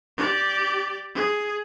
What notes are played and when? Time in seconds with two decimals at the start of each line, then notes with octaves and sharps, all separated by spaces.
0.18 G4 D5
1.14 G#4